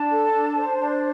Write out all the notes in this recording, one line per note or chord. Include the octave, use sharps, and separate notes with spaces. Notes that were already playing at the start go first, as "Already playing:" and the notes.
Already playing: D4 A5
A4
D4
C5
D4